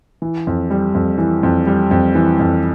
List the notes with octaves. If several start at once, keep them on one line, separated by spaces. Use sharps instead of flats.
E3
F2
G3
F2
E3
F2
G3
F2
E3
F2